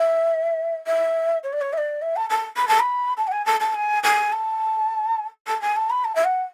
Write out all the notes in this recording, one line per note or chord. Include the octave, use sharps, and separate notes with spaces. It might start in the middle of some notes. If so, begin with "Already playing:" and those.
Already playing: E5
E5
C#5
D5
C#5
E5
D5
E5
A5
A5
B5
A5
B5
A5
F#5
G#5
A5
A5
G#5
G#5
A5
A5
G#5
A5
B5
A5
E5
F#5